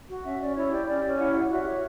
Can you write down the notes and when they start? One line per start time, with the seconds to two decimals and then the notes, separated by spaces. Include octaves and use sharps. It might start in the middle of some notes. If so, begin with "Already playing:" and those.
0.08 F#4
0.24 C#4 E5
0.39 C#4 D5
0.55 E4 C#5
0.72 G4 D5
0.87 C#4 D5
1.03 C#4
1.19 E4 F#5
1.34 G4 F#5
1.50 F#4 E5
1.66 C#5 E5